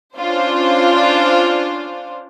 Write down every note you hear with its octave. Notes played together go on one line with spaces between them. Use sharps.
C#4 D4 F4 C5